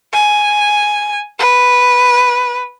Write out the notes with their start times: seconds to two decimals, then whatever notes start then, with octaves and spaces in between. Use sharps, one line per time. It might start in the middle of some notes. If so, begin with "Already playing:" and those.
0.13 G#5
1.39 B4